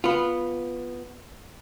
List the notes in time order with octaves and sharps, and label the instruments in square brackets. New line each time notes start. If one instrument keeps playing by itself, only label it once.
[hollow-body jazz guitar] B3 F4